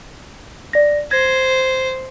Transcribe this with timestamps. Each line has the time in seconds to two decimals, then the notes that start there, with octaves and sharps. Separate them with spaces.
0.73 D5 A#6
1.11 C5 G#6 A#6